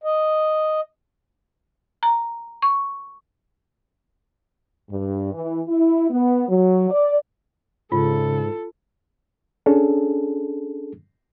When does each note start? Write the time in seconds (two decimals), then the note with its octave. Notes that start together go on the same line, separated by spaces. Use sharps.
0.04 D#5
2.03 A#5
2.62 C#6
4.90 G2
5.34 E3
5.69 E4
6.10 B3
6.48 F#3
6.90 D5
7.92 G#2 C#3 F4 A4
9.66 C#4 D4 G#4 A4